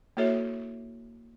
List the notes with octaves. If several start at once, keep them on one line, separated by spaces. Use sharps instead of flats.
A#3 E4 F#4 A4 C#5 E5